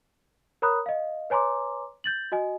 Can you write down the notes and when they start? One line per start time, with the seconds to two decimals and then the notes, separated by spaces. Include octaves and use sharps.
0.62 A#4 C#5 A#5 B5 D#6 F#6
0.86 D#5 F5
1.30 B4 C#5 G#5 A#5 C6 D6
2.04 G6 A6 F#7
2.32 F#4 D#5 G#5